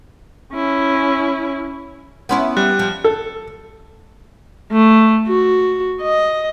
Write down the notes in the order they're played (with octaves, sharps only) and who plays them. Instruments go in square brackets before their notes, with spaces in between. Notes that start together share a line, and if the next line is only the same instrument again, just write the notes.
[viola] C#4 E4
[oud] B3 C#4 E4 [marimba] F#5 B5 C6
[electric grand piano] G3 [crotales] F#6
[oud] F3
[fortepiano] A4
[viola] A3
F#4
D#5